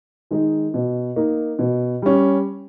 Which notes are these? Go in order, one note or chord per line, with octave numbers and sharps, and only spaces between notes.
D#3 G#3 D#4
B2
A#3 D#4
B2
G3 C#4